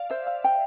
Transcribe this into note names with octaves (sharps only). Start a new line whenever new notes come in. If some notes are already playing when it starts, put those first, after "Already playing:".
Already playing: D5 F5
C5 E5
F5
G5